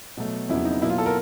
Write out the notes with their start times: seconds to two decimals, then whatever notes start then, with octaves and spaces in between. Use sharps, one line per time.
0.17 B2 F#3 A3
0.49 F2 C#3 F#3 B3 E4
0.65 D#4
0.82 B2 F#3 A#3 E4
0.90 F4
0.98 A4
1.06 A#4